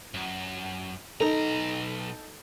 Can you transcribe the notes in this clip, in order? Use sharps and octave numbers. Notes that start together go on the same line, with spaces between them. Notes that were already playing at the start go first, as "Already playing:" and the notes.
F#2
B1 D#4 A4 A#5